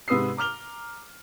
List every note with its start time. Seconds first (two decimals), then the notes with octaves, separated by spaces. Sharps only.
0.08 G#2 C3 B4 D#6 E6 C7
0.37 A#5 D6 F6 F7 G7